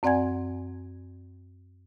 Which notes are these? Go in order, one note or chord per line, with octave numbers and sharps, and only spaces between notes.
F#2 C4 D5 F#5 G#5 G#6